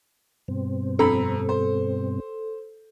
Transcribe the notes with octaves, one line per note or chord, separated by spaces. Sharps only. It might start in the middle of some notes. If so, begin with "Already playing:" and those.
G2 B2 C4
F2 A4 A#5 B5
C5